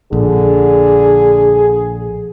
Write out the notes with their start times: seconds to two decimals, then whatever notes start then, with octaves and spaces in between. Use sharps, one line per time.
0.13 A#1 D3 G#4